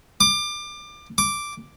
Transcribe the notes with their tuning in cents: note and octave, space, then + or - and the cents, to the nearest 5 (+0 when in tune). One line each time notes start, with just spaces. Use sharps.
D6 +25
D6 +0